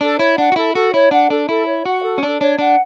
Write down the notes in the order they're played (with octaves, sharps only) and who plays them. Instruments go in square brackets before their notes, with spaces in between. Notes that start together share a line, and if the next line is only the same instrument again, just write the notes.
[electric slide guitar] D4 [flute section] A4
[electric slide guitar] E4 [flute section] C#5
[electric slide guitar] D4 [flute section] F#5
[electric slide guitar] F#4
[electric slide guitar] E4 [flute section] A4
[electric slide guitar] F#4 [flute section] A4
[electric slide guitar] E4 [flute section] C#5
[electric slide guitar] D4 [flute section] F#5
[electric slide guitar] D4 [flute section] A4
[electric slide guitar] E4 [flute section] A4
[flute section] C#5
[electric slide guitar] F#4 [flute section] F#5
[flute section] A4
[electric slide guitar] C#4
[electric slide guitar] D4 [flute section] A4
[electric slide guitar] D4 [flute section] C#5
[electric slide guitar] D4 [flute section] F#5